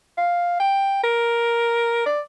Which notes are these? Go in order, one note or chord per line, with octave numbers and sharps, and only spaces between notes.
F5
G5
A#4
D5